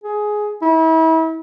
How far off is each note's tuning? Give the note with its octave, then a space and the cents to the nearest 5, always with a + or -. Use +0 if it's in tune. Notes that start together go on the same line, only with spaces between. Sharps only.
G#4 +10
E4 -35